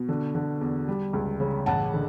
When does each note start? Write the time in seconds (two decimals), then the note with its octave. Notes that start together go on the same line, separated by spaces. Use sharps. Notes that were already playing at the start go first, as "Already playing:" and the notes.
Already playing: B2
0.09 D3
0.35 D3
0.61 E2
0.88 G3
1.13 C#2
1.40 C#3
1.66 A1 F#5 A5
1.94 D3